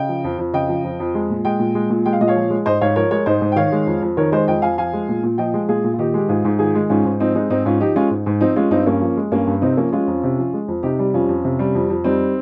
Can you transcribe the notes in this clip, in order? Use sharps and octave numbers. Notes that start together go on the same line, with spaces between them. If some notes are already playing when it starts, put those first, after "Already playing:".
Already playing: C#3 D#5 G5
F3
F2
F2
C#3 D#5 G5
F3
F2
F2
G#3
A#2
G#3 D#5 G5
A#2
G#3
A#2
G#3 G5
F5
A#2 D#5
C#5 F5
F3
G#3
G#2 C5 D#5
G#2 C#5 F5
F3 A#4 C#5
G#3 A#4 C#5
G#2 C5 D#5
G#2
G5
D#3 C#5 F5
G#3
F2
F2
D#3 A#4 C#5
G#3 C5 D#5
F2 D#5 G5
F2 F5 G#5
F3 F5 G#5
G#3
A#2
A#2
F3 D#5 G5
G#3
A#2 F4 G#4
A#2
F4
D#3 D#4 G4
G#3 G4
G#2 F4 G#4
G#2
D#3 F4 G#4
G#3
G#2 C#4 F4
G#2
F3 C4 D#4
G#3 C4 D#4
G#2 C4 D#4
G#2 C#4 F4
F3 D#4 G4
G#3 C#4 F4
G#2
G#2
F3 C4 D#4
G#3 C#4 F4
G2 C4 D#4
G2 A#3 C#4
F3
G#3
G2 A#3 C#4
G2
C3 C4 D#4
F3 A#3 C#4
G#3 C#4 F4
F2
C3
F3
G#3
F2
C3 D#4 G4
G3
F2 C#4 F4
F2
C3
G3
F2
F2
G3 C4 D#4